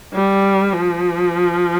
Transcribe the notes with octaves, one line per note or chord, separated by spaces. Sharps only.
G3
F3